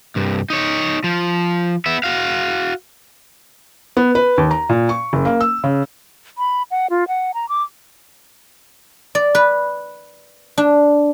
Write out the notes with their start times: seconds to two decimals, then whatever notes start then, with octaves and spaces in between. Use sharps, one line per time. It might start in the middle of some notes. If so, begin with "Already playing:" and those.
0.16 C2 G2
0.50 D#4 C#5
1.04 F3
1.86 B3 E5
2.04 F#4 F5
3.97 B3
4.15 B4
4.38 D#2
4.51 A#5
4.69 A#2
4.89 C#6
5.13 F#1
5.25 A#3
5.41 E6
5.64 C#3
6.38 B5
6.71 F#5
6.90 F4
7.08 F#5
7.34 A#5
7.49 D6
9.15 D5
9.35 B4
10.57 D4